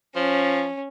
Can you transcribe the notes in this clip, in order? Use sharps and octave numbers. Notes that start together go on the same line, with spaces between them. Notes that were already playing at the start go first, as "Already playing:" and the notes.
F3 C#4